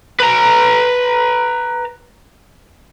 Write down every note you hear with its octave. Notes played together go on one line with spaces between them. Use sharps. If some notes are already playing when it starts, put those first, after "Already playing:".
B4 A#5